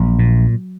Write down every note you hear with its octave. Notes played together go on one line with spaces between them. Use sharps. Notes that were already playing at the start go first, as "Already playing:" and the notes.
Already playing: A#1 F#3
A#2